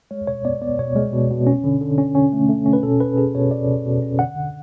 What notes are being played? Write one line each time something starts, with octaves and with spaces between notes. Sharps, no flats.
G#3 C#5
B2 C#5
B3 D5
B3 D5
B2 C#5
G#3
B2
B2
C#4
D3
D3
C#4
C#4
A3
A3
C#4
B4
B2 A4
C#4 B4
C#4 G#4
B2 C#5
B2 D5
B2
B2
C#4
D3 F#5
D3